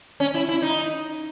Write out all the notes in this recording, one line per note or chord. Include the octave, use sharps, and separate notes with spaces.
C#4
E4
E4
D#4